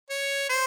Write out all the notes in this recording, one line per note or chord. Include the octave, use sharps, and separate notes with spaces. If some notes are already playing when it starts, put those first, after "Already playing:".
C#5
C5